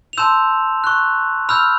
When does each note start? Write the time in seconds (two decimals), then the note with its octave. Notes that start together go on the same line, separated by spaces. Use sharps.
0.13 F7
0.18 A5 C6 E6 G6 E7
0.84 C#6 F#6
1.49 B5 E6 F6 G6 F7